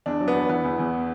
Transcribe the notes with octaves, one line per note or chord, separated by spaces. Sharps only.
E2 D4
F#3
B3
E2
E3 B3
E2
E2